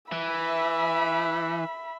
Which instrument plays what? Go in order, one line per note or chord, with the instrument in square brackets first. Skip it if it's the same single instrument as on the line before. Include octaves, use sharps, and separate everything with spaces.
[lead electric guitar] E3 [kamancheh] E5 B5